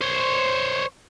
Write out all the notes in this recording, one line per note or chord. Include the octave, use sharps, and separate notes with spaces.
C5 C#5